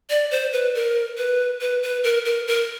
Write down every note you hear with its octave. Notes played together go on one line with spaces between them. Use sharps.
D5
C5
B4
A#4
B4
B4
B4
A#4
A#4
A#4